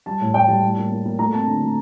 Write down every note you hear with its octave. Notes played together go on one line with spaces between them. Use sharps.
G3 A5
A2
A2 G5
G3 A5
A2
A#3
A#3
A#3
A3 A#5
C4 A5
D3
A3